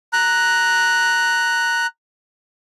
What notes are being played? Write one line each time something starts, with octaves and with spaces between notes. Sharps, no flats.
A#5 F#6